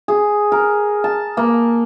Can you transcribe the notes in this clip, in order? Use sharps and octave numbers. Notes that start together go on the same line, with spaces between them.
G#4
A#4
A5
A#3